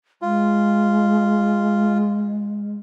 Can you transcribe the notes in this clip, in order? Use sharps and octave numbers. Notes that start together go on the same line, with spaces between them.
G#3 F4